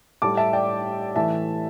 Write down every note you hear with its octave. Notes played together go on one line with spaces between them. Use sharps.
A2 G3 A5 D6
E5 A5
D5 G5
A2 E3 A3 E5 A5